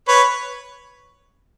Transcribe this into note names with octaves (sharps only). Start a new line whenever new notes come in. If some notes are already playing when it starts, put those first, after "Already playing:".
B4 C#5